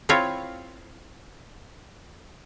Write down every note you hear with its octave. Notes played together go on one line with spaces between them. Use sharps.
C4 E4 F4 C#5